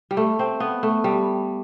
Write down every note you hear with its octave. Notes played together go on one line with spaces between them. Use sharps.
G3
A3
C4
B3
A3
G3